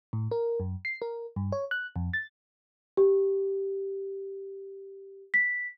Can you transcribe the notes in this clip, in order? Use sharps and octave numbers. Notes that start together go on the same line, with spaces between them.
A2
A#4
F#2
C7
A#4
G2
C#5
F#6
F2
A6
G4
B6